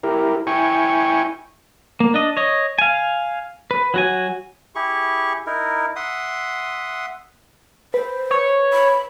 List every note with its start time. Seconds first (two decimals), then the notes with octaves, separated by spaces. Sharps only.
0.03 E4 G4 A#4
0.47 E4 G5 G#5 C#6
2.00 A#3
2.14 D4 D#5
2.37 C#5 D#5
2.79 F5 G#5
3.71 B4
3.94 F#3 F#4 G#5
4.75 E4 G4 G#4 C#6
5.47 D#4 E4 A#4
5.96 E5 F#5 C6 D#6
7.94 B4 C5
8.31 C#5
8.73 B5